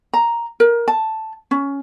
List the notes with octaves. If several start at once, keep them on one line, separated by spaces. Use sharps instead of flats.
A#5
A#4
A5
C#4